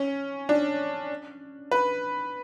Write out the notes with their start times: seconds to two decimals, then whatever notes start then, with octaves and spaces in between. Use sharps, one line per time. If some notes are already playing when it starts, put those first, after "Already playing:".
Already playing: C#4
0.49 D4
1.71 B4